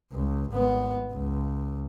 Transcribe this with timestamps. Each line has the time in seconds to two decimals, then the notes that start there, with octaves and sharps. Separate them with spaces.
0.12 C#2
0.50 G#1 B3
1.13 C#2